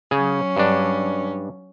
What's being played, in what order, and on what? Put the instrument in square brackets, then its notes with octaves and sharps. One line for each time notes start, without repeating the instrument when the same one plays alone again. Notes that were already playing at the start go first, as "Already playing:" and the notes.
[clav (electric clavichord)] C#3 G#4 [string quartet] F#3 C#4
[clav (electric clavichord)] G2 D4